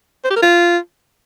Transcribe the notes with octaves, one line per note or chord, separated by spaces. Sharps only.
C5
G4
A#4
F4